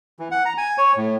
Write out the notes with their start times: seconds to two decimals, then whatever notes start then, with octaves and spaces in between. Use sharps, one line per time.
0.19 E3
0.31 F#5
0.45 A#5
0.58 G#5
0.78 C#5
0.96 A2